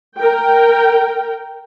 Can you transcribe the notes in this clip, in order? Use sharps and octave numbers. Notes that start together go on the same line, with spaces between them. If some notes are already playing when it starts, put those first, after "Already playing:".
A#4 G5